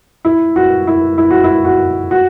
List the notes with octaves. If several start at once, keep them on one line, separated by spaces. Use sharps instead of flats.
E4
F#4
E4
E4
F#4
E4
F#4
F#4